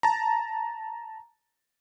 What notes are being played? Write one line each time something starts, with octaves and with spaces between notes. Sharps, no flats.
A5 A#5